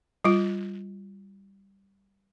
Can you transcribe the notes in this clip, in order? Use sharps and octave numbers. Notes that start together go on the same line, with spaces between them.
G3 F4